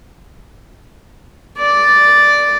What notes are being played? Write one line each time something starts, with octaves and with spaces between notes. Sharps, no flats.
D5